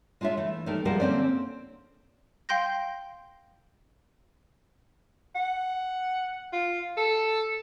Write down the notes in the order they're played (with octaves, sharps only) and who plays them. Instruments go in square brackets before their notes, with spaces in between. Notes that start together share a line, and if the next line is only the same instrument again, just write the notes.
[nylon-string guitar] G#3 D4 F4 C#5 E5
E3 A3
D#3 G3 A3 A#4
C3 F3 G3 G#3 F#4 A#4
D3 A#3 C4 C#4 D5
[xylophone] F5 G5 C6 G6 A#6
[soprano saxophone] F#5
F4
A4